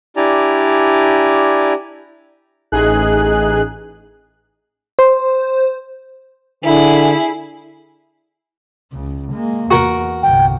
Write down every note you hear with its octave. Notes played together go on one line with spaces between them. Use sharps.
D4 E4 G4 D5 G#5 A#5
A1 D#4 G#4 F#6
C5
D3 E4 G#4
C#2 C#3
G#3 A#3
E2 F#4 A#4
G1 C2 G5